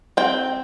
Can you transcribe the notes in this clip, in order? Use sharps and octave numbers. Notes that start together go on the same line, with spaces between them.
C4 G5